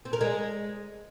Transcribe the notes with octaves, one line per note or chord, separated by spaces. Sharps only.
C4
A#4
G#3